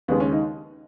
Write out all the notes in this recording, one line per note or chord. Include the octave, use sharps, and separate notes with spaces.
D#2 C#3 G#3 B3
C#4
D#4